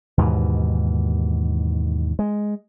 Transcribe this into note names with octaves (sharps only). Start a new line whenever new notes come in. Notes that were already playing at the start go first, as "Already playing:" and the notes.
D#2 G#2 B2 E3
G#3